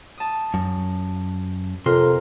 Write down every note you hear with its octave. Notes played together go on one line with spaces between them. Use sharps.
A5 D#6
F#2
F2 C3 F4 A#4 C6